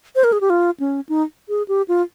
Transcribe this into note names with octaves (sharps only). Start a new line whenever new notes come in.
C5
A#4
G#4
G4
F4
C#4
D#4
G#4
G4
F4